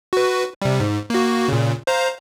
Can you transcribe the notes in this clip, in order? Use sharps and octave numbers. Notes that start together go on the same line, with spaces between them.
F#4 B4
C3 G3
G#2
A#3 F#4
A#2 C#3
C5 F5 A#5